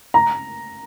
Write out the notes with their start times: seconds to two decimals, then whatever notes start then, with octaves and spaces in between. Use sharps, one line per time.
0.14 A#5